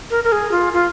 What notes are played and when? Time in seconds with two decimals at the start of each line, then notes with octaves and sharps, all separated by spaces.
0.10 A#4
0.24 A#4
0.32 G#4
0.51 F4
0.73 F4